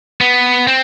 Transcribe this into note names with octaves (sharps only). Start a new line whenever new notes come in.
B3
C4